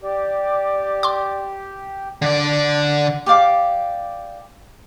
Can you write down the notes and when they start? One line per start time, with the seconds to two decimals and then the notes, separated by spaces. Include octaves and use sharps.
0.02 G4 D5
1.03 C6 D6
2.22 D3 D5
3.26 G4 D5 F5 D6